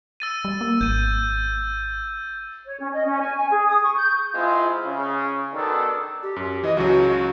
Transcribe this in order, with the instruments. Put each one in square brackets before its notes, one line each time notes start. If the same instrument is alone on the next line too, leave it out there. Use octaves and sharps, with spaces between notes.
[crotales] E6 A6 D#7
[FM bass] G3
A#3
[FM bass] G#1 [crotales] G6 D#7
[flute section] C#5
C#4
D#5
C#4
G#5
G#5
G#4
D#6
C#6
G6
[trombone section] G#3 C4 E4 F4
C#3
B2 D#3 B3 D4 D#4 A4
[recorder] G4
[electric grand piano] F#2
[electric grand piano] E3 [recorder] D#5
[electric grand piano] C#2 C#3 F#3 [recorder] F#4